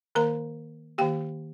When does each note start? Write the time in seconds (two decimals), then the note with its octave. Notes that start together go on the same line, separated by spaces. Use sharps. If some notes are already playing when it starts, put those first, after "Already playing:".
0.15 D#3 A#3 A#4 A#5
0.98 D#3 A#3 G4 G5